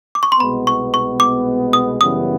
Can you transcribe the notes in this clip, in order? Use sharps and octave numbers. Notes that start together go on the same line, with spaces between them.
D6
C#6
C6
C2 B2 G#3 B3 B5
C#6
C#6
D6
D#6
F#2 C#3 E3 G3 B3 D#6